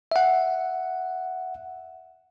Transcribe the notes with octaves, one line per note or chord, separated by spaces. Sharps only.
E5 F#5